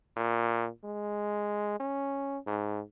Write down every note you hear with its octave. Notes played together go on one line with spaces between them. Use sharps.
A#2
G#3
C#4
G#2